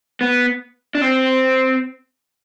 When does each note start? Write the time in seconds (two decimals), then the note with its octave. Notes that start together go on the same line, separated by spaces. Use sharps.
0.21 B3
0.95 D4
1.01 C4